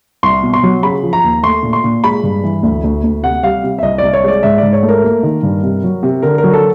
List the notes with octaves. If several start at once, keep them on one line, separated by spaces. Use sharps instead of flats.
C2 C6
B2
C6
F#3
C#3 B5
F3
A#5
D#2
A3 C6
A#2
C6
A#2
G#3 B5
G2
E3
D2
D2
D2
C3 F#5
G3 F5
C3
E5
C2 D#5
C2 D5
C#5
G#3 D5
G#2 E5
D5
G#2
C#5
A3
A#4
A#3
D#3
G2
C3
F#3
C3
D3 A#4
A#4
F#3
A4